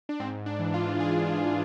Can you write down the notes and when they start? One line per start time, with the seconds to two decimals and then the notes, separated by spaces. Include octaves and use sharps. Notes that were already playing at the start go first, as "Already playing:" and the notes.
0.09 D4
0.20 G#2 C4
0.46 D4
0.60 E3
0.74 F4
1.00 G#2 G#4
1.27 G#4
1.41 E3